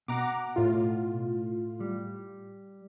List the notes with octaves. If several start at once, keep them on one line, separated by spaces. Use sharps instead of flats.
B2 F#5 A#5 D6
A2 F4
G3